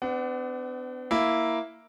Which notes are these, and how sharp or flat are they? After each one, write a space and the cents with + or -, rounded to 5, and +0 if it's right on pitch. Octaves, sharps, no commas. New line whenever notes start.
B3 +45 D4 +0 F#5 +25
A#3 +0 E4 +0